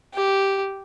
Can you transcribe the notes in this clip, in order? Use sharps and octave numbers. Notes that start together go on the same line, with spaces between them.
G4